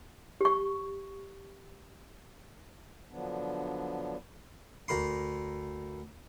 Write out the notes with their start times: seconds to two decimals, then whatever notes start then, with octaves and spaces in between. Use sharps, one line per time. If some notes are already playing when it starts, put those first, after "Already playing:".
0.41 G4 C#6
3.11 D3 F3 F#3 B3 D4
4.88 D2 A#4 B5 C6